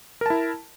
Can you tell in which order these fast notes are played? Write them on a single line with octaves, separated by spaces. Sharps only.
A#4 A5 E4